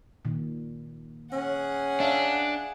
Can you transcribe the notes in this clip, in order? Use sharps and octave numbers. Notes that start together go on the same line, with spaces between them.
A#2 D#3
C#4 G#4 F#5
D4 E5 F5